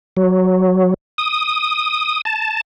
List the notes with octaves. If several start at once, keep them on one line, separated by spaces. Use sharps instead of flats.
F#3
D#6
A5